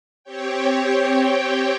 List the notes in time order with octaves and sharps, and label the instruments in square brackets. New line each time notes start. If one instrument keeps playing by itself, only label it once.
[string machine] C4 G4 C#5 G5